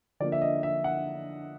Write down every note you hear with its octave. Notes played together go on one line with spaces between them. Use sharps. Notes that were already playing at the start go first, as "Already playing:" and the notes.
D3 F3 A#3 D5
E5
D#5
E5
F#5